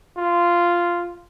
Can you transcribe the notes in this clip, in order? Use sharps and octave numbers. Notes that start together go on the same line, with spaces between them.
F4